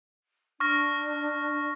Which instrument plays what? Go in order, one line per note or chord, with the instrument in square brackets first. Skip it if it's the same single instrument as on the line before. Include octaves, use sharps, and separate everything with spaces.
[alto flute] D4 [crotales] C#6 F6 A#6